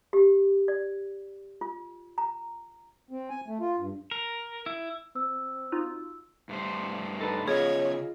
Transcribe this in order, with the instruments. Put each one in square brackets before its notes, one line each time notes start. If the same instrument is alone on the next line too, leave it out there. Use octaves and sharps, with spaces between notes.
[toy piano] G4
D5
F4
A#5
[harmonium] C4
G#5
A3
F4
G2
[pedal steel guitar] A#4
E4
[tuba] C4 [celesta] E6
[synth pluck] D#4 F4 F#4
[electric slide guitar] G2 A3 C5
[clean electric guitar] D#4 A4 B4
[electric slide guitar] C#3 B3 [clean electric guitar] F4 D#5 [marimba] G#4 [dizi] C#5